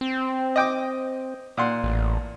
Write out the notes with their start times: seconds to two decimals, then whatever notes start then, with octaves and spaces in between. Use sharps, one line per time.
0.01 C4
0.56 D#5 G5 D6
1.57 A#2 F#5 C6
1.84 A1